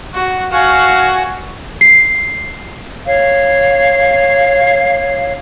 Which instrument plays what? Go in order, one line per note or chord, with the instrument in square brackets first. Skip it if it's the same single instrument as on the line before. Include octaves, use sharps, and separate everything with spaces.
[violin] F#4
[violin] F#4 G#5 [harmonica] F5
[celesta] C7
[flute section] C#5 F5